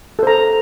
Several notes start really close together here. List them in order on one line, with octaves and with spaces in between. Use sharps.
A4 C5 A#5